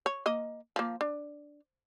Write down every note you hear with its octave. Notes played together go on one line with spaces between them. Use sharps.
C#5
A#3 D#5
F3 A#3
D4